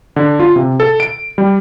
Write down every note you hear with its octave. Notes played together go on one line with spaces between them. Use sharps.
D3
F4
C3
A4
D7
G3